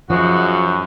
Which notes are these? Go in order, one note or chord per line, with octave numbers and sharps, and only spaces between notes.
F#2 F3 G#3 D#4 F#4